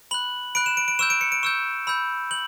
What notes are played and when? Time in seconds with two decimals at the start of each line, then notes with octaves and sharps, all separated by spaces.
0.11 B5 F#6 F#7
0.55 B5 F#6 D7
0.66 E7
0.77 D7
0.88 D7
0.99 C#6 E6 G6 E7
1.10 D7
1.21 C#7
1.32 D7
1.43 C#6 E6 G6 E7
1.87 B5 E6 G6
2.31 G6 F#7